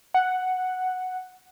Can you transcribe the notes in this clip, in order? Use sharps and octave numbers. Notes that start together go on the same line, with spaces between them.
F#5